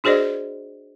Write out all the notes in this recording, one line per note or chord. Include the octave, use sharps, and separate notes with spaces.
D4 F#4 G#4 C5 D5 D#5